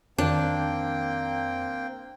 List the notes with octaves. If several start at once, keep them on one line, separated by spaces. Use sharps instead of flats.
F2 D#3 A#3 C4 D4 G5